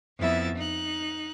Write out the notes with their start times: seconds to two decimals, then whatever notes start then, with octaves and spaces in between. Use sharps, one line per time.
0.20 F2 B3 E4 E5 A6
0.56 D#4 F#6